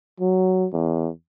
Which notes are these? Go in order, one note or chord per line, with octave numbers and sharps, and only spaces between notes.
F#3
E2